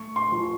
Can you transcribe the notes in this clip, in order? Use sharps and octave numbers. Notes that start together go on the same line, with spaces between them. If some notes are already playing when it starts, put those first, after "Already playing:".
Already playing: A3 C#6
C6
F3